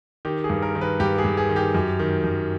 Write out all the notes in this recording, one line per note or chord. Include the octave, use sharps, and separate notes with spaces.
D#3 G4
G#4
G2
A#4
D#3
B4
G2 G4
G#4
G2
G#4
D#3
G4
F#2
D#3
F#2